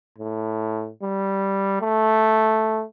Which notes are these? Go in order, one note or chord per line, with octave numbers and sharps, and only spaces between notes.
A2
G3
A3